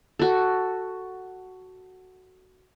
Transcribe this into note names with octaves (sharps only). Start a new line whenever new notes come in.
F#4 A4